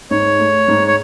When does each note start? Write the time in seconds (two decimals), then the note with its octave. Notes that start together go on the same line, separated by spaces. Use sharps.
0.11 G#2 C#5
0.39 A3
0.68 G#2
0.87 C#5